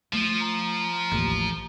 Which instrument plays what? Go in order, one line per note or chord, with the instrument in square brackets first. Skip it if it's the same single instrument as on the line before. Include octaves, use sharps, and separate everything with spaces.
[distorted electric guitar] F3 [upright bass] A3
[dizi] A#5
[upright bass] A1 D#2